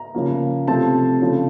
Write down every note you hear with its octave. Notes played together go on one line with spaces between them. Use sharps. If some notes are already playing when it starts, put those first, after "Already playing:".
Already playing: A#5
C#3 F3 A#3
C3 F3 A3 C4 A5
C#3 F3 A3